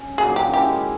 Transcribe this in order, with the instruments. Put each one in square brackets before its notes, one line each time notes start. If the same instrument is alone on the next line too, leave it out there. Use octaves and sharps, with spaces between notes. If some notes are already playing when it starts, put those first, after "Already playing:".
Already playing: [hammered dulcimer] C#4
[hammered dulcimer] A#2 F#3 A#3 D#4 [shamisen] G#4
[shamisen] G4
[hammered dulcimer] D#3 G#3 C#4 E4 [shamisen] G4